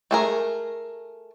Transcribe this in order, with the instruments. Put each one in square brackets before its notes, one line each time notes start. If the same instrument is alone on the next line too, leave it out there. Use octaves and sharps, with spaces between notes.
[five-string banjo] A3 G#4 A#4